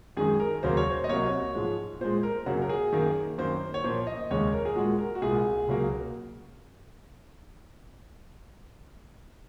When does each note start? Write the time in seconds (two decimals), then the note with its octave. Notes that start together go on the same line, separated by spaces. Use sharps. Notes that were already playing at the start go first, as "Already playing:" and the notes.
0.17 F#2 D#3 G#3 G#4
0.40 A#4
0.63 D#2 C#3 F#3 A#3 C5
0.77 C#5
0.91 C5
1.04 D#5
1.09 C2 C3 F#3 A#3 C#5
1.55 G#2 F3 G#3
2.01 A#2 G#3 C5
2.23 A#4
2.46 F#2 C#3 F#3 A#3 F#4
2.62 A#4
2.69 G#4
2.93 F#2 D#3 A#3
3.38 F#2 D#3 A#3 C5
3.74 C#5
3.84 A#2 F3 A#3 C5
4.07 D#5
4.30 D#2 C#3 G#3 C#5
4.52 A#4
4.65 G#4
4.76 A#2 G#3 F#4
4.99 A#4
5.15 F#4
5.21 C2 A#2 G#3 G#4
5.67 C#2 C#3 F#3 A#3